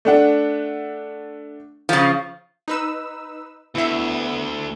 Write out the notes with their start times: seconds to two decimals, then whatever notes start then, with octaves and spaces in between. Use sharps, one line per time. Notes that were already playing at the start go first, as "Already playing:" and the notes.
0.05 A3 D4 F#5
1.89 C#3 F3
2.68 D#4 B4 E6
3.75 D2 B3 E4 E5